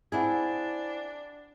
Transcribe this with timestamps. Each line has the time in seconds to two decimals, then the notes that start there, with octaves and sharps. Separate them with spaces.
0.12 C4 D4 E4 G#4 F#5 G#5 G#6